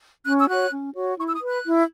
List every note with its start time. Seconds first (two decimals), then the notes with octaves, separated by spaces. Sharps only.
0.25 C#4 F#6
0.39 E6
0.48 F#4 C#5 F#6
0.72 C#4
0.94 F#4 C#5
1.18 E4 C#6
1.28 E6
1.33 D#6
1.41 B4
1.48 F#6
1.64 E4